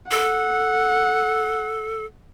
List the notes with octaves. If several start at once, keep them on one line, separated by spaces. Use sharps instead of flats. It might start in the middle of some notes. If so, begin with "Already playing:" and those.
A4 F#5